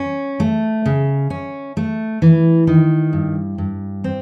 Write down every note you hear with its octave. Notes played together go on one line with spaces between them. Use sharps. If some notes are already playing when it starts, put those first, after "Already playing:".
Already playing: C#4
A3
C#3
C#4
A3
E3
D#3
G2
G2
C4